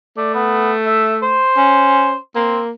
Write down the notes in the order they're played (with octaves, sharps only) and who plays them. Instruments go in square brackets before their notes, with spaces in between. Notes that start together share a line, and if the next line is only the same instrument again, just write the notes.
[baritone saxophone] A3 [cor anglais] D5
[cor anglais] B3
E5
C5
[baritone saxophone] C#4
[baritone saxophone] A#3 [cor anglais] C4